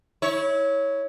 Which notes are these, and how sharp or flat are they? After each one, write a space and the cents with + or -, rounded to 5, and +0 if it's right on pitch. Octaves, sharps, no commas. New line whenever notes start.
E4 -30 C#5 +0